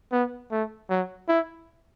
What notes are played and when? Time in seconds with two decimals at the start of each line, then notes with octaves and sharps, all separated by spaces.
0.12 B3
0.51 A3
0.90 F#3
1.28 E4